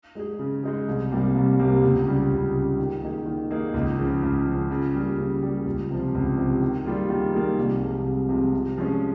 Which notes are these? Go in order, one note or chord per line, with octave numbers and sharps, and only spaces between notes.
G#3 D#4 G#4
C#3
G#3 D#4 G#4
C2
C3 G3 A#3
C2
C3 G3 A#3
C#2
C#3 G3
C#2
C#3 G3
D#3
A#3 D#4 G#4
D#3
A#3 D#4 G#4
C#2
C#3 F3
C#2
C#3 F3
C#3
G3 A#3
C#3
G3 A#3
C#2
C3 F3
C#2
C3 F3
D#3
G3 A#3 F4 G#4
D#3
G3 A#3 F4 G#4
C2
C3 F3 G#3
C2
C3 F3 G#3
C3
F3 G#3 C#4